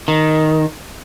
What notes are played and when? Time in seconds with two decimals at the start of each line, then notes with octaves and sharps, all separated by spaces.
0.08 D#3